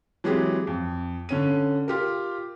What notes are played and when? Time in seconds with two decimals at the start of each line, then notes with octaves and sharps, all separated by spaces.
0.24 E3 F#3 G#3 C4 G4 G#4
0.67 F2
1.29 D3 C#4 D#7
1.88 F4 G4 A#4